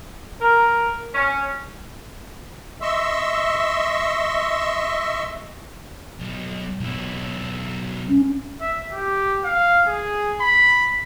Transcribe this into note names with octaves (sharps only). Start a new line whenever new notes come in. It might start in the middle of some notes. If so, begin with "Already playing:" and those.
A#4
C#4
D#5 E5 C6 C#6 E6
B1
B1 E4
C#4
E5
G4
F5
G#4
B5